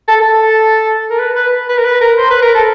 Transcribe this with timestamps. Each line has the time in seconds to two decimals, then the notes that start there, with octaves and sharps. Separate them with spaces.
0.08 A4
0.21 A4
1.10 A#4
1.19 B4
1.36 B4
1.68 B4
1.78 A#4
1.85 B4
2.01 A#4
2.18 C5
2.30 B4
2.42 A#4
2.55 A4